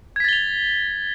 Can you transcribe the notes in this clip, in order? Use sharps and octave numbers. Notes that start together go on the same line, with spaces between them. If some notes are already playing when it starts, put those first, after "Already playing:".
G#6 A6 B6 F7 G7